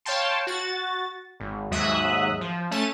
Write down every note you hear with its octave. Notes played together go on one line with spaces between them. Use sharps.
C#5 F5 G5 A5 C6
F#4 A6
G#1
D#2 G#2 F#3 E5 D#6 F#6
F3
A3 C#4 A5 D#7